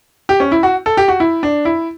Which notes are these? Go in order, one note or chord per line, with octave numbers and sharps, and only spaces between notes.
G4
C#4
E4
F#4
A4
G4
F#4
E4
D4
E4